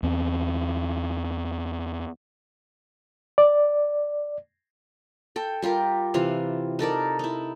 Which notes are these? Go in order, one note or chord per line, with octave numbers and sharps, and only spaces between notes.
E2 C4
D5
A4 G5
G3 F4 G4 A#4
C3 E3 F4 F5
D#4 A4 A#4 D5
D#4 E4